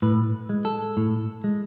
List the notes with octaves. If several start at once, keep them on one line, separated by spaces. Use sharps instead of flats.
A2 B4
G#3
A4
A2
G#3